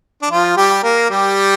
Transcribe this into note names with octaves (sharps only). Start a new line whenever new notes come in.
D4
F3 F4
G3 G4
A#3 A#4
G3 G4